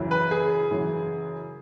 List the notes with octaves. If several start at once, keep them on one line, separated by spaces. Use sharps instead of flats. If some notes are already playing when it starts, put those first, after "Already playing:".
Already playing: F#2 C#3 E3
B4
G#4
F#2 C#3 E3